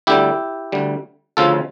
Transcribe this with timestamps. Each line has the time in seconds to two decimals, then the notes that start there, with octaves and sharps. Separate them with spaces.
0.07 D2 D3 G3 E4 G4
0.72 D2 D3 G3
1.37 D2 C#3 F3 F4 A4